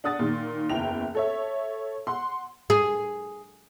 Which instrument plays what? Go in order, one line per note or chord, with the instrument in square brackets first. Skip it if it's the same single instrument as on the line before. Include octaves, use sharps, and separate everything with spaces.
[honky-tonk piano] D4 F#5 D#6 A6
A#2 D#3
F#1 E2 E4 G5 F7
A4 C#5 E5
F#5 C6
[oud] G#4